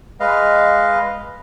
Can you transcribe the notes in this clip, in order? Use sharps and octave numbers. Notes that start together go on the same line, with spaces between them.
G#3 B4 D#5 F5